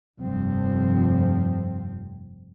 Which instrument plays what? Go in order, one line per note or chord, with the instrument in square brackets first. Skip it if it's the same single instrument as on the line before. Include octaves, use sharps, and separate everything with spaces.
[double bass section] F1 G2 F3 C4